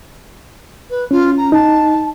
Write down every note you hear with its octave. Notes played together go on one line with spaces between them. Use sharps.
B4
C#4 F4
A#5
D#4 A5